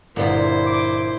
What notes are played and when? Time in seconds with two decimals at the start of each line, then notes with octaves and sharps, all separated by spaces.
0.16 G1 A#2 B3 E4 F4 C5 D5
0.66 D6